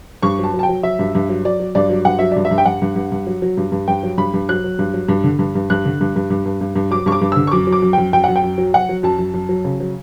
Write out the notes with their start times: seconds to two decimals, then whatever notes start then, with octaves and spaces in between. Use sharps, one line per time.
0.23 G2 C#6
0.39 F#3 A5
0.54 F#3
0.59 A5
0.63 G5
0.69 F#3
0.83 F#3 E5
0.99 G2
1.15 G2
1.29 F#3
1.45 F#3 D5
1.60 F#3
1.75 G2 D5
1.90 F#3
2.05 G2 F#5
2.19 F#3 E5
2.32 G2 D5
2.45 E5
2.51 G2
2.58 G5
2.65 G2 F#5
2.82 G2
2.96 G2
3.12 G2
3.27 F#3
3.42 F#3
3.57 G2
3.72 G2
3.88 G2 G5
4.03 F#3
4.18 G2 B5
4.34 G2
4.49 F#3 F#6
4.64 F#3
4.79 G2
4.94 F#3
5.08 G2
5.24 D3
5.39 G2
5.55 G2
5.70 G2 F#6
5.85 D3
6.01 G2
6.16 G2
6.30 G2
6.46 G2
6.61 G2
6.76 G2
6.91 F#3 D6
7.06 G2 C#6
7.12 D6
7.21 G2
7.32 D3 E6
7.47 C#6
7.51 F#2 D6
7.67 F#3
7.72 D6
7.82 F#2
7.93 F#2 G5
8.13 F#2 G5
8.24 F#2 F#5
8.36 G5
8.44 F#2
8.58 F#3
8.74 F#3 F#5
8.89 F#3
9.03 F#2 A5
9.19 F#2
9.34 F#2
9.49 F#3
9.64 C#3
9.80 F#3